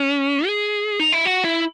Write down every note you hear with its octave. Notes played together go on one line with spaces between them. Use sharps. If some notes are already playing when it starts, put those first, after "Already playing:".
Already playing: C#4
G#4
D#4
E4
F#4
E4